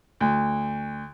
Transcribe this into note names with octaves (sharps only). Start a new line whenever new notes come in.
D2